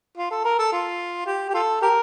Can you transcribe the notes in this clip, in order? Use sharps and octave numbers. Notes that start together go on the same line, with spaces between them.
F4
A4
A#4
A4
F4
G4
G4
F4 A4
G4 A#4